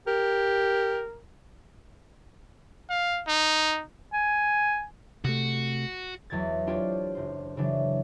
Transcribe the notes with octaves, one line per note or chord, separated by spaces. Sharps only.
G4 A#4
F5
D#4
G#5
C3 A3 F#4
E2 F#3 G#3 G#6 A6
D4 F4 G4 C5 C#5
F#1 C5
C#3 E3 F#3 D4